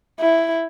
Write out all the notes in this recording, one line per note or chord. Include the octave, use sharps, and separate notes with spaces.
E4